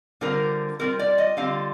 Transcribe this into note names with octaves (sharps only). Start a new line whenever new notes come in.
D3 G3 C4 F4 A#4
D3 G3 C4 F4 A#4
D5
D#5
D3 G3 C4 F4 F5